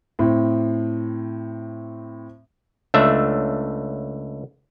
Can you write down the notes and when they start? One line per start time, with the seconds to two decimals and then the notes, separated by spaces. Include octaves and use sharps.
0.19 A2 C4
2.94 C#2 A3 D4 E5